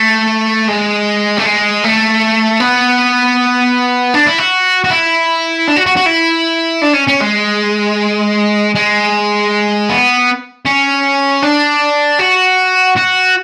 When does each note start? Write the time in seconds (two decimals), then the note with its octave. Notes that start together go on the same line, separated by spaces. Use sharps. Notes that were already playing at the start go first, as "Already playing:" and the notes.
Already playing: A3
0.68 G#3
1.38 A3
1.45 G#3
1.84 A3
2.60 B3
4.14 D4
4.27 E4
4.39 F#4
4.84 F#4
4.90 E4
5.68 D4
5.76 F#4
5.86 F#4
5.96 F#4
6.06 E4
6.83 D4
6.95 C#4
7.08 C#4
7.21 G#3
8.75 G#3
9.90 B3
10.66 C#4
11.43 D4
12.19 F#4
12.97 F#4